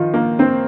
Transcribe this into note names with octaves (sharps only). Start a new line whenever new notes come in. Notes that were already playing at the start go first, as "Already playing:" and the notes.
Already playing: D#3 F3 D#4 F4
A#3 A#4
C4 C5